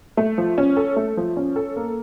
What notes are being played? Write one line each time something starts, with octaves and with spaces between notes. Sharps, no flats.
A3
F3
C#4
A4
A3
F3
C#4
A4
A#3